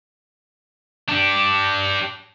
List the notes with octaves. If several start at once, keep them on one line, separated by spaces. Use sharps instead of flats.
D4 G4